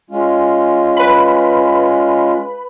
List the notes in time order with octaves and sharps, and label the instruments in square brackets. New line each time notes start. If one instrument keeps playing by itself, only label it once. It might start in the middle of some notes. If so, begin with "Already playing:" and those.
[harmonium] G#3 C#4 F4
[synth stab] B4 B5